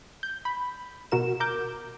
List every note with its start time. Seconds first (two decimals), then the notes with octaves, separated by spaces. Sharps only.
0.23 G6
0.45 B5
1.12 B2 F#4 A#4 E7
1.40 A#4 D6 G6